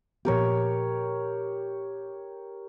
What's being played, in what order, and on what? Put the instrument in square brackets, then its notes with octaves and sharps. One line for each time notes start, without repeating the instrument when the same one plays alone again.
[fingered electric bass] A#2 F3 B3 [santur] G4 A#4 C#5